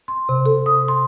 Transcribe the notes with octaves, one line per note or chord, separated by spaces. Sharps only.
C6
C3
A4
D#6
C6